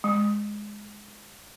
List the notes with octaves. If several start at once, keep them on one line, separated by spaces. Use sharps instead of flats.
G#3